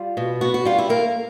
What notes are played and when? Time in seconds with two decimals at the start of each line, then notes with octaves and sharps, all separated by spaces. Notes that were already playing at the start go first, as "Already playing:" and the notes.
Already playing: G3 F4
0.17 B2
0.41 B3 F#4
0.54 F#4
0.65 G3 F4
0.78 E4
0.89 A#3 A#4